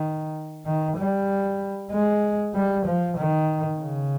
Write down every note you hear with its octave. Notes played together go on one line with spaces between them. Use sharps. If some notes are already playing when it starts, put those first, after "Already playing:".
Already playing: D#3
D#3
G3
G#3
G3
F3
D#3
C#3